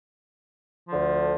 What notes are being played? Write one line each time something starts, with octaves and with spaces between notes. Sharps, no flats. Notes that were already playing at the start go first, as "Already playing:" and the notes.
D2 D3 F3